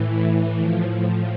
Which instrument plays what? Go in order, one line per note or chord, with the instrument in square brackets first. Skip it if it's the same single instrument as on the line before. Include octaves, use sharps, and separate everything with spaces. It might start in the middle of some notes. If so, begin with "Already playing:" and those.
Already playing: [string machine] A2 E3
A2 F3